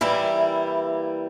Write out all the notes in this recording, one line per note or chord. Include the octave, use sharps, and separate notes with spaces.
E3 G3 A#3 E4